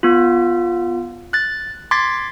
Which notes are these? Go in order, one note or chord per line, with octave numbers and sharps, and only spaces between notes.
B3 F4
F#6 A6
C6 D6 G#6 A6 B6